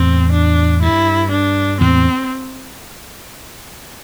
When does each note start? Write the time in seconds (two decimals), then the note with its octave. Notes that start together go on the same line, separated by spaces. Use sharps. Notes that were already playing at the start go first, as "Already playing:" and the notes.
Already playing: E2 A2 C4
0.32 D4
0.82 G2 E4
1.32 D4
1.81 E2 A2 C4